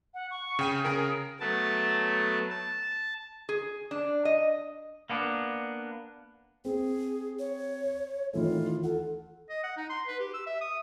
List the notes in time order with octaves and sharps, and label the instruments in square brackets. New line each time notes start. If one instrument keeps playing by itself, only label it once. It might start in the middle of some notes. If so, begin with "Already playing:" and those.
[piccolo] F#5
C#6
[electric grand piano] C#3 G5 D#7
[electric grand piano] C#3 G#4 A#4 [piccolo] D7
[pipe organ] F#3 A3 B3 A5
A5
[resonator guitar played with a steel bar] G#4
D4
D#5
[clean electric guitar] A#3 B3 D4
[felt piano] C4 [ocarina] G#4
[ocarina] C#5
[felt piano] D#3 E3 A3 [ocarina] F4
[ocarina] A4 [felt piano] F#5
[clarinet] D#5
F#5
D#4
C6
B4
G4
E6
E5
D#6